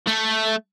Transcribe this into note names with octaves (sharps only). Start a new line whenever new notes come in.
A3